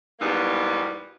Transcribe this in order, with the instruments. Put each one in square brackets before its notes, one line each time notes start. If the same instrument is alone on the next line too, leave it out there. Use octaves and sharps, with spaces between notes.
[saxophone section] E2 G#2 F#3 G3 A#3 B3